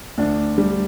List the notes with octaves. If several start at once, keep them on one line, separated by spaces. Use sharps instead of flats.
D2 D4
G3